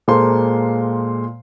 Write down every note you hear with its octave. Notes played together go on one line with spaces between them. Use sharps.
A#2 G#3 A#3 A4 C5 C6